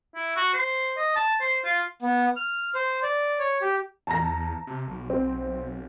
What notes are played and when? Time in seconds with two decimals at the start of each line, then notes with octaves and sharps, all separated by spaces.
0.15 E4
0.36 F#4
0.54 C5
0.97 D#5
1.16 A5
1.41 C5
1.64 F4
2.02 B3
2.36 F6
2.75 C5
3.03 D5
3.39 C#5
3.61 G4
4.07 E2 A5 A#5 A#6
4.67 C3
4.87 B1
5.10 C4